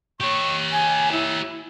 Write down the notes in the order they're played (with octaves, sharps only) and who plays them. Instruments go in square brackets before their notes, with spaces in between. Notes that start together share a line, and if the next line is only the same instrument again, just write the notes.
[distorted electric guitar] G4 C#5 [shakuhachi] C#6
[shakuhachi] G#5
E4